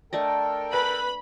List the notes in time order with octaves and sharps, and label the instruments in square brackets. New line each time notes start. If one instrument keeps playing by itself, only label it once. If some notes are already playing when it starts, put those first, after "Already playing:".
[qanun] A3 D4 D#5 [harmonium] A4 A#4 G5
[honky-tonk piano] B4 [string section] B5